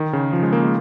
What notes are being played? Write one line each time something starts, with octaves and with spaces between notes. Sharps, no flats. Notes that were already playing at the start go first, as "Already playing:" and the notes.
Already playing: D#3
C#3
F3
G#3
A#3
G#3